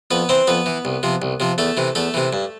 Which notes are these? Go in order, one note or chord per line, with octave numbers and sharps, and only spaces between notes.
F2 B3 B4
E3 C4 C5
F2 B3 B4
E3
C2
C3 F3
C2
C3 F3
E2 A3 A4
C3 E3
E2 A3 A4
C3 E3
G2